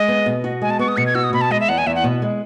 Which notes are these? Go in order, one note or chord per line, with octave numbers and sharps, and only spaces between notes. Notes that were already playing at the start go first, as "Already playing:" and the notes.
Already playing: G#3 D#5
B3
B2
F#4
G#3 G#5
A5
B3 C#6
D#6
B2 C#7
G#6
F#4 E6
D#6
B2 B5
A5
G#3 D#5
E5
E2 F#5
G#5
E2 E5
F#5
B2
G#3